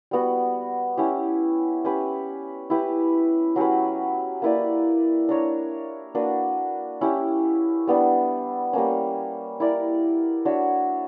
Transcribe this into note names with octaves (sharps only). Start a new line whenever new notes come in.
G3 B3 F#4
C#4 E4 G4
C#4 G4 B4
E4 G4 B4
F#3 C#4 G4 B4
A#3 E4 B4 D5
D4 A#4 C#5
A#3 D4 F#4 B4
C#4 E4 G4
G3 B3 D4
G3 A#3 C#4
E4 A#4 D5
D4 F#4 C#5 E5